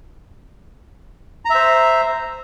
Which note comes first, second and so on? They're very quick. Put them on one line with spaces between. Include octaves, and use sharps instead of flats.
A#5 E5 C5